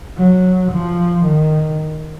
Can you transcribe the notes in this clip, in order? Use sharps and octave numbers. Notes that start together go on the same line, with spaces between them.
F#3
F3
D#3